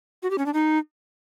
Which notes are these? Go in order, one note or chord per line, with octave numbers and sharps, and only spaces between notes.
F#4
G4
C#4
D4
D#4